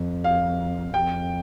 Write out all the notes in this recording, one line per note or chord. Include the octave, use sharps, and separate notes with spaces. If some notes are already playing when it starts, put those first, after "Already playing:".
Already playing: F2
F5
F2 G5